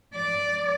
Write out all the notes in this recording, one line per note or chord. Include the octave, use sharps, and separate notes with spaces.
D5